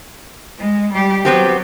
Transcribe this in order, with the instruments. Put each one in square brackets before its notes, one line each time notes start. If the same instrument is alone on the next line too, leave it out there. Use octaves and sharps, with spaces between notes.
[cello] G#3
G3 G4
[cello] F#3 [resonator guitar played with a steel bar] B3 C4 G4